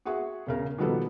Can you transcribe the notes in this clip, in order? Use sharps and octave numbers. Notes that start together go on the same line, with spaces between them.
F#4 G#4 E5 F#5 C#6
E1 C#3 A#4
B2 D#3 F3 G3 B3 A4